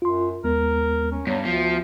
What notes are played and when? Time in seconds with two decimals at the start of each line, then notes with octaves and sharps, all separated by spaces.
0.02 F#2 F4 C6
0.44 D#2 G#3 B3 A#4
1.12 C#4
1.27 G2 F#3 B3
1.45 D2 F3